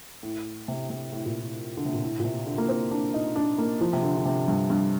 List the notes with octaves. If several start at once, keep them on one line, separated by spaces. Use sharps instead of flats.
A2
C3
C3
A2
A#2
A2
D3
C3
A#2
A2
A#2
C3
D3
A#3
C4
D4
D#4
D4
A#3
F3
C3
D3
D3
C3
G2
G2